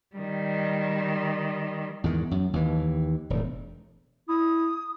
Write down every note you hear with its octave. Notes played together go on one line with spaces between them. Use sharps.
D#3 G3
E2 G#2 D#3
F#2
D#2 E3
E1 A2
E4 D#6